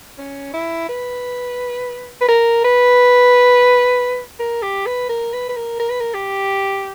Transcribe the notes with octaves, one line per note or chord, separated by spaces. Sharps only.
C#4
E4
B4
B4
A#4
B4
A#4
G4
B4
A#4
B4
B4
A#4
A#4
B4
A#4
G4